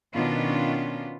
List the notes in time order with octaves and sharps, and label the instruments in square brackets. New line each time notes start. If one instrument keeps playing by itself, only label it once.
[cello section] B2 D#3 B3 C#4 D4 F4